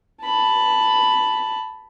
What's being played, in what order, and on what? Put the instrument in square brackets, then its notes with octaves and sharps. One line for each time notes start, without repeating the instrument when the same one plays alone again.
[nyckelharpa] A5 B5